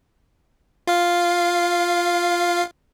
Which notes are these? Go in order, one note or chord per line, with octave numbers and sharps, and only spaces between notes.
F4 F5